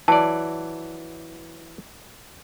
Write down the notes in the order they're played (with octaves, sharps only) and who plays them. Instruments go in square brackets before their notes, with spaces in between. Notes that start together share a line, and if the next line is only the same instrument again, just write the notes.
[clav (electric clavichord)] E3 F#3 D5 [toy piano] A5